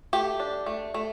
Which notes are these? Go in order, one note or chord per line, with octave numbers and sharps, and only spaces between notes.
A3 G4
D4
A3
A3